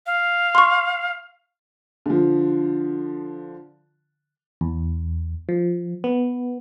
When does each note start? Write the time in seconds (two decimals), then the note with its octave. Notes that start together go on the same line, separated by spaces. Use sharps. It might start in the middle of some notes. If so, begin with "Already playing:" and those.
0.06 F5
0.55 C6 C#6
2.06 D3 F3
4.61 E2
5.49 F3
6.04 B3